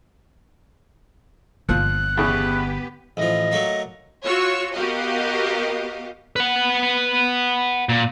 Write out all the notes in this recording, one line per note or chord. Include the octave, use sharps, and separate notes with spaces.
G1 A#2 D3 F3 F#6
E2 C#3 B3 G4 B4
A1 F3 D#5
F#3 A3 A#3
F4 F#4 C#5 C#6 E6
B3 F#4 G4 A#4 D#5 F5
B4 F#5
A#2